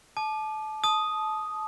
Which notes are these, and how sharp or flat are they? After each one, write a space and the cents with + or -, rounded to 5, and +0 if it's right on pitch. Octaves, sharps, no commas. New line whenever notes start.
A5 -25 D6 +30
A5 -20 D#6 +0